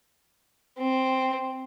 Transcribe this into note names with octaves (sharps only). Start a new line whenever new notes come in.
C4